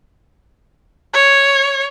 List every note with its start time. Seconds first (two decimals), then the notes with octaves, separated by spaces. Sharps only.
1.13 C#5